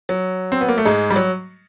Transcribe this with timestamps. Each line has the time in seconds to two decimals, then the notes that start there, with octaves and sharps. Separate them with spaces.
0.09 F#3
0.52 C4
0.61 B3
0.69 A#3
0.78 A3
0.85 G#2 G#3
1.10 G3
1.16 F#3